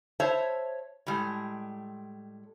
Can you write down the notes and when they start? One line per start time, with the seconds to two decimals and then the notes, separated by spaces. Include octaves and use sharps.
0.20 C5 C#5 E5 A5
1.07 A2 G3 G#3